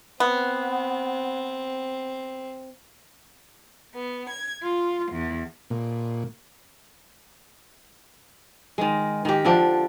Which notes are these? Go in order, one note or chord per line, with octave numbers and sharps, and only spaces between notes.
B3 C4
B3
G#6
F4
E2
A#2
D#3 G#3
D#3 G4
D3 F3 D4